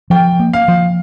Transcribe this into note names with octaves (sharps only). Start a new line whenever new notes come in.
F3 G5
A#3
F5
F3